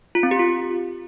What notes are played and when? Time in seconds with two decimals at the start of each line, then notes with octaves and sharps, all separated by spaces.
0.15 F4
0.23 C4
0.31 G4
0.39 F4